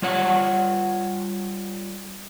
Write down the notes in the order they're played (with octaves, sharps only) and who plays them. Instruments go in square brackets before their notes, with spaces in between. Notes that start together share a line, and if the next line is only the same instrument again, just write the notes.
[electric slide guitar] G3 F4 C#5 F#5